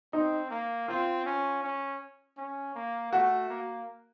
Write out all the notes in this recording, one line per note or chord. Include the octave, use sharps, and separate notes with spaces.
C4 D#4
A#3
C4 F4
C#4
C#4
C#4
A#3
A3 F#4
A#3